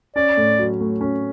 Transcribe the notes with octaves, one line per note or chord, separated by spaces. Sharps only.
C#4 D5
A2
F#3
A2
C#4